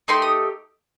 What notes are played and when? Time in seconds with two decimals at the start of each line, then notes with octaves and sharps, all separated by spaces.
0.08 A3 D#4 G4 C6
0.22 D#6